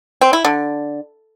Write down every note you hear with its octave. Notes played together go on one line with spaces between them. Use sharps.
C4
E4
D3